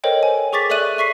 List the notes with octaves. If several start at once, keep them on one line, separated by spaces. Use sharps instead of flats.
A4 A#4 C5 C#5 D#5 G5
G#5
G#4 C#6 D6 A6 B6
A4 D5 E5 F#6 D#7 F#7
E5 C#6 B6 C7